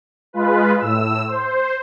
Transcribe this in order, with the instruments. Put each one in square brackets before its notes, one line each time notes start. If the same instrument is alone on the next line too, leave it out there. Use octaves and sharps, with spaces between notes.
[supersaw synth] G#3 F4 B4
A2 E6
C5